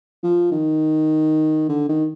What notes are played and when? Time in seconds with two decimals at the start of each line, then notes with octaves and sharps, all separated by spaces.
0.23 F3
0.52 D#3
1.69 D3
1.89 D#3